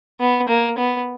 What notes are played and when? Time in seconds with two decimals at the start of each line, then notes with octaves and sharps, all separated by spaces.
0.20 B3
0.49 A#3
0.78 B3